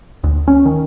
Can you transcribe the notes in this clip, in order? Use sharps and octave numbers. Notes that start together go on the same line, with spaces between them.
D2
C#4
D#3